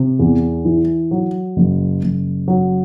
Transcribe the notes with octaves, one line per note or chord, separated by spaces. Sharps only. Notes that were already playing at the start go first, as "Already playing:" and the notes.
Already playing: C3
E2
E3
F#3
F#1
F#1
F#3